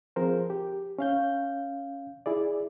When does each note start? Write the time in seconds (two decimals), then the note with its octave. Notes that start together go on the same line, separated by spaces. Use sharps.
0.16 F3 C4 G#4 A#4 C5
0.50 G4
0.99 C#4 F5 G6
2.26 E4 G#4 D5